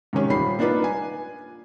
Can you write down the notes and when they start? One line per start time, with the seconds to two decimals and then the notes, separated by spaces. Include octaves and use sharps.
0.13 G#2 C3 D#3 C#4 G4
0.30 D#1 D#3 G3 B5 C7
0.59 A#3 D4 D#4 F4 B4
0.84 G#5